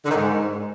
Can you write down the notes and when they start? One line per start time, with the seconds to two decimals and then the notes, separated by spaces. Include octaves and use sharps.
0.04 D3
0.10 D#3
0.15 G#2